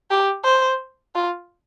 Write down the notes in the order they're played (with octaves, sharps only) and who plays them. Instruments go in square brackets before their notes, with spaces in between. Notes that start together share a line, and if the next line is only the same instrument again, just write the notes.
[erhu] G4
C5
F4